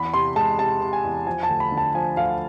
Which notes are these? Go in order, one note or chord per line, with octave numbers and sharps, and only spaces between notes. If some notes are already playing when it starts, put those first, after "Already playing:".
Already playing: E2 B5
C3 C6
G#3 A5
C3 A5
C3
G#5
E2
F3 G#5
A5
D2
B5
D3
A5
F3 G#5
D2 F5